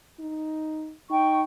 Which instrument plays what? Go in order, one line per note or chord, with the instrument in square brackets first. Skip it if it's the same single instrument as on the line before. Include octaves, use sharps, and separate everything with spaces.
[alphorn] D#4
[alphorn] D#4 [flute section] G5 C#6